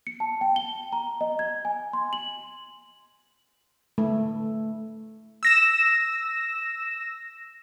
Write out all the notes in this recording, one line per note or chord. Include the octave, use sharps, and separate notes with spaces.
C#7
A5
G5
G7
A#5
D#5
G#6
G#5
C6
F#7
A3
E6 A#6 E7